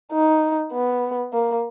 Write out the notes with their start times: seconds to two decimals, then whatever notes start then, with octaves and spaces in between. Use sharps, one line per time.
0.13 D#4
0.72 B3
1.33 A#3